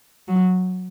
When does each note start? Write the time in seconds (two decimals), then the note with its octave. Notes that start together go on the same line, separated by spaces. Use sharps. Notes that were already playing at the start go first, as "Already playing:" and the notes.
0.28 F#3